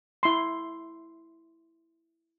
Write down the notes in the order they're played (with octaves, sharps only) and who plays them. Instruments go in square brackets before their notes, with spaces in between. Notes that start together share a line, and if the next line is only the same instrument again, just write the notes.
[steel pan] E4 C6